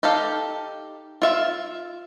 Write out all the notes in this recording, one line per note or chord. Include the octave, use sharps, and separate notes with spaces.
D#4 G4 A4 F5
F4 E5 F5